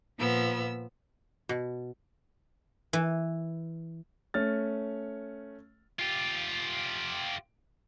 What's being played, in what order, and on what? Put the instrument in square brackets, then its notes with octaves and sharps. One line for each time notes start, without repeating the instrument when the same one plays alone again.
[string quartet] A#2 F3 B3 E6
[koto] B2
[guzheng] E3
[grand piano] A3 C#4 F6 A6
[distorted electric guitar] F4 G4